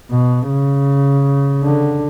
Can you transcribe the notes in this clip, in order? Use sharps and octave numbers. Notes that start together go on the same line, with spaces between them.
B2
C#3
D3